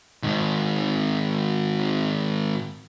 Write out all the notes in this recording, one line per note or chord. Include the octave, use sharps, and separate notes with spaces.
G#2 D#3